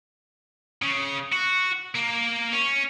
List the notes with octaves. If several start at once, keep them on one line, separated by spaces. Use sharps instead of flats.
C#3
F#4
A#3
C#4